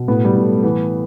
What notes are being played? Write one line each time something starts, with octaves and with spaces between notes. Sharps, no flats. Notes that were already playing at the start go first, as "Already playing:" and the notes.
Already playing: B2
A2 B3
G3
A2 A3
A3
E3 B3